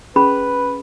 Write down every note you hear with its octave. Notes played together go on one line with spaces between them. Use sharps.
C#4 G#4 B4 B5